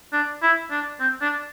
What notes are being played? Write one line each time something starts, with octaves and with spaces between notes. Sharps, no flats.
D4
E4
D4
C4
D4